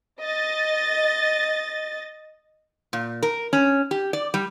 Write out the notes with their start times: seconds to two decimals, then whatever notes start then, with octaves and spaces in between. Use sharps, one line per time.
0.21 D#5 A6
2.93 A#2
3.23 A#4
3.53 C#4
3.91 G4
4.13 D5
4.34 G3